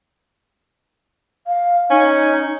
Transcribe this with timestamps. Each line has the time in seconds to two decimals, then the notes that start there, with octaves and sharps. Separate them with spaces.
1.47 F5
1.90 C#4 D#4